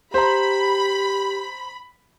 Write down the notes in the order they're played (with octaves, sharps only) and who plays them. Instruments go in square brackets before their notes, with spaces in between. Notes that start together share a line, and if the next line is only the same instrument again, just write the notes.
[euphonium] G4 [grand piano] C5 A#5 [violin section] B5